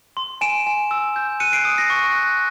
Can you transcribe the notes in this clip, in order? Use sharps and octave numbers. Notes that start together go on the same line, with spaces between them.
C6
G#5 D7 E7
G#5
E6
G6
F#6 C#7 D#7
C7 D7
D#6
A#6 C7
C#6
F#6